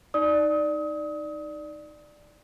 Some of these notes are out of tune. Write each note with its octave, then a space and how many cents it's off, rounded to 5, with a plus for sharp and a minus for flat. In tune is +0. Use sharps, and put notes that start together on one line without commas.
D#4 +0 D5 +10 D#6 +30